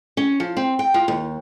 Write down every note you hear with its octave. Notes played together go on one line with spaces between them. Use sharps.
C#4
F3
C4
G5
F4
D#2